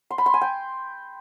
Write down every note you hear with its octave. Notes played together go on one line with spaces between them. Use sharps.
C6
B5
C6
G#5
G5